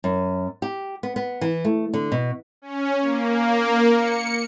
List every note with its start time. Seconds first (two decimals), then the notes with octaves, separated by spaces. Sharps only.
0.04 F#2
0.62 G4
1.03 B3
1.16 B3
1.41 E3
1.65 A3
1.94 D3
2.12 B2
2.62 C#4
3.01 A#3
3.95 C#7